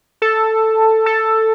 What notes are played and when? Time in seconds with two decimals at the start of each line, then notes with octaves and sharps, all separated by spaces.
0.22 A4
1.06 A4